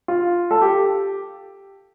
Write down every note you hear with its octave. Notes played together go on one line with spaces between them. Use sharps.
F4
A4
G4